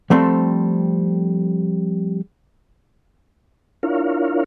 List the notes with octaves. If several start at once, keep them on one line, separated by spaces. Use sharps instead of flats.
F3 G3 A3 C4 A4
D4 E4 F4 A#4 C#5 F5